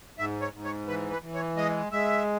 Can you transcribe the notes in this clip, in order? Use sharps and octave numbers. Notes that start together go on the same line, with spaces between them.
G#2 E5
C#5
G#2
C#5
E3 B4
B4
E3
C#5
G#3 D#5
G#3 E5